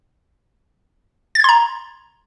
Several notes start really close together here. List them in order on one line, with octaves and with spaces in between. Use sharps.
A6 G#6 C6 A#5